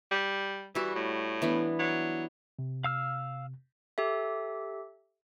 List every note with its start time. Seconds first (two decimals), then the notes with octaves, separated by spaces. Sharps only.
0.11 G3
0.75 E3 G3 F#4
0.95 A2
1.42 E3 B3 D4
1.79 F#3
2.59 C3
2.84 F5 E6 F6
3.98 G4 A4 E5